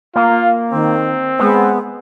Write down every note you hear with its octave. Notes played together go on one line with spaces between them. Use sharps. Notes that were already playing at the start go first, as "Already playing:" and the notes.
A#3 F4
D#3 C4
G#3 B3